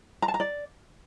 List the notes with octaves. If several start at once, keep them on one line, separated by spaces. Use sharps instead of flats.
A#5
A5
A#5
D5